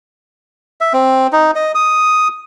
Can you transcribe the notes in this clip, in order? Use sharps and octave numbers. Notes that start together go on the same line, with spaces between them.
E5
C4
D#4
D#5
D#6